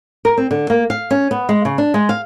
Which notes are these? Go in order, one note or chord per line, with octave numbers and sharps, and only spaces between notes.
A#4
C4
D3
A#3
F5
C#4
B3
G#3
C#3
D4
G#3
F5